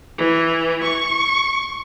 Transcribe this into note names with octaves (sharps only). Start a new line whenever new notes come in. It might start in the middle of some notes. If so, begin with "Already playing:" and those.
E3
C#6